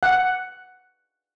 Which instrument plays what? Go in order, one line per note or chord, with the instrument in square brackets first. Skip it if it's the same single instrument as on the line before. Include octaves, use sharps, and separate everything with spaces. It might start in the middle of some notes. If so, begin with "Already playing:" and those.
[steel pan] F#5